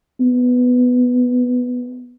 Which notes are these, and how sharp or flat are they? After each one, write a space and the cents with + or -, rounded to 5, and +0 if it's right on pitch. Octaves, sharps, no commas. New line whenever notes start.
B3 +5